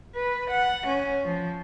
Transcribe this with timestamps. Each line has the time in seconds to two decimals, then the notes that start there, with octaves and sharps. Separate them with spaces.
0.15 B4
0.51 F#5
0.87 C#4
1.24 F3